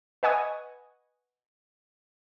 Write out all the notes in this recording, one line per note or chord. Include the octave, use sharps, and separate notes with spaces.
B4 D#5 F#5 G#5 C#6 D#6